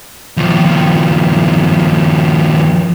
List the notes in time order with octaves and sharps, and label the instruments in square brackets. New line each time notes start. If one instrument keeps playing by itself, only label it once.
[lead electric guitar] D#2 F3